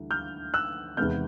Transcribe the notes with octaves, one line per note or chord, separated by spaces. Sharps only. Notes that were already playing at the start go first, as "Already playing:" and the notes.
Already playing: D2 E3 G3
F6 G6
E6 F#6
E2 C3 D#3 G#3 B3 F6 G6